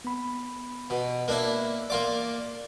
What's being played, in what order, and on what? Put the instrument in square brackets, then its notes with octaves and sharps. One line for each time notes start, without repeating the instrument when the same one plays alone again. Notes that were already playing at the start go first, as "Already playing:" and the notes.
[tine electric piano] B3 B5
[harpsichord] B2
A#3 D4 E4
[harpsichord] A#3 F4 D6 [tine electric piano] D5